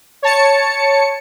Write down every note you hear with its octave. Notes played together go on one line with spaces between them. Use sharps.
C#5 A5 C#7